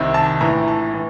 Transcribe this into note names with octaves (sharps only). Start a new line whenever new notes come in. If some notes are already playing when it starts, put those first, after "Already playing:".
Already playing: C2 C3 D#3
A5
A#1 A2 E3 A#5
A5
A2 E3